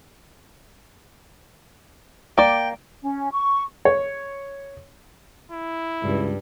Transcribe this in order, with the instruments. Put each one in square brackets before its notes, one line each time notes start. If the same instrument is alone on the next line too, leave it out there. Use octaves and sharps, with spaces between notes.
[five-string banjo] A#3 D5 [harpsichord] G5
[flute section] C#4
C#6
[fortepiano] C#5
[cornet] E4
[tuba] C#2 [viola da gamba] G2